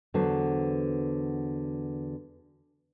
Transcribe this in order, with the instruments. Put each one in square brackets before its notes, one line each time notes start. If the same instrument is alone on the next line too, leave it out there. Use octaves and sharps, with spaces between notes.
[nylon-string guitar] E2 D3 F#3 B3 F#4 C5